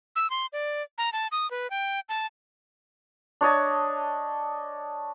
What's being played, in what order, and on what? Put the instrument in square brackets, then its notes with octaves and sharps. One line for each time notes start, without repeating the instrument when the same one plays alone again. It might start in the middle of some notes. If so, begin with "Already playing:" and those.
[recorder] E6
C6
D5
A#5
A5
D#6
B4
G5
A5
[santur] D4 C#5 D#5 A5